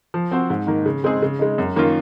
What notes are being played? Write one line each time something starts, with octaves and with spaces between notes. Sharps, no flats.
F3
C4 F#4 C5
G#2
D#3 A#3 D#4
C#3
G#3 C4 D#4 G#4
C#3
G#3 D#4
F#2
D#3 A#3 C#4 F4